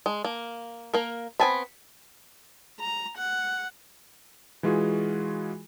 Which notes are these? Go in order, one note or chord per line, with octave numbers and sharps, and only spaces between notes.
G#3
A#3
A#3 A#4
B3 C4 G#5 A5 B5
A#5
F#5
E3 G#3 F4 F#4 G#4